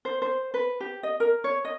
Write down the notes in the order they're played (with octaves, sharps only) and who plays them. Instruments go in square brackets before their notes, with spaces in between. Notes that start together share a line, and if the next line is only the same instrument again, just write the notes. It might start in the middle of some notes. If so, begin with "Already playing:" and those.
[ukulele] C5
C5
B4
G4
D#5
A#4
C#5
D#5